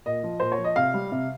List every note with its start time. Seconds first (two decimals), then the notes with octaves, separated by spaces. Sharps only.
0.06 A#2 D#5
0.23 F3
0.40 A#2 C5
0.52 C#5
0.58 F3
0.64 D#5
0.76 C3 F5
0.94 G3
1.12 C3